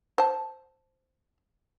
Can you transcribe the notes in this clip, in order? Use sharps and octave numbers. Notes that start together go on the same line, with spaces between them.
C5 A5